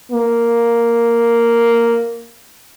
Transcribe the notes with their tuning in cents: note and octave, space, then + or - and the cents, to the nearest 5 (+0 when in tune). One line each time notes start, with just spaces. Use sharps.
A#3 +0